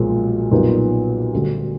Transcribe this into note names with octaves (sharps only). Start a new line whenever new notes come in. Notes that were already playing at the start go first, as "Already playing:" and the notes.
Already playing: B1 A#2 F3 G#3
B1 A#2 G3 B3 D#4
D2 D3 G3